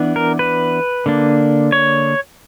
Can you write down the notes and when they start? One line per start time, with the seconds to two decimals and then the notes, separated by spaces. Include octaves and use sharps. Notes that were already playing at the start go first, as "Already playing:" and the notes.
Already playing: E3 B3 D4
0.16 A#4
0.39 B4
1.06 D3 A#3 D4
1.72 C#5